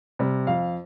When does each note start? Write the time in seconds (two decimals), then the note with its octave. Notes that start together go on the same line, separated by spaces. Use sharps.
0.19 C3 G3
0.47 F2 F5